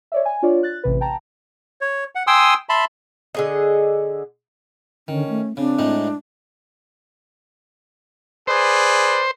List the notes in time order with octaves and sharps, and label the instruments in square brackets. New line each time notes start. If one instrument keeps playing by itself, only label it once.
[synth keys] C#5 D5 E5
G#5
D4 F4 C#5 D5
F#6 A6
A1 C3 B4
G5 A5 A#5
[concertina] C#5
F#5
G5 G#5 C6 D#6 E6
E5 A5 B5 C6
[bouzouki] D3 G#4 D#5
[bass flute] D3 [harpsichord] D#3 [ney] C#4
[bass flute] A3
[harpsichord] C#3 [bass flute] C4 [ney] D4
[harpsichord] A2 G#3 D#4
[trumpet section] G#4 B4 D5 [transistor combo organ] C5